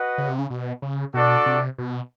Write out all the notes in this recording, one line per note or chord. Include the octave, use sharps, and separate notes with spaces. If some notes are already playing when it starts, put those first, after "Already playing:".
Already playing: F#4 B4 D#5 F#5
C#3
C3
C#3
B2
C#3
B2 D4 F#4 A4 D5
C3
B2